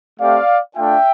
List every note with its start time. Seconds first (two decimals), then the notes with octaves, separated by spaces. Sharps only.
0.19 A3 C4 G4 D5 F5
0.76 A3 D4 F4 E5 G5